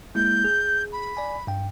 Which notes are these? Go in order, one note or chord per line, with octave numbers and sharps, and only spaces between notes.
G#3 A#3 E4 G6
G#4
B5
D5 G#5
G2 G5